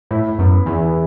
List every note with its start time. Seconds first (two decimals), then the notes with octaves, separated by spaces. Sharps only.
0.11 A2 E4
0.38 F#2 B3
0.66 E2 E3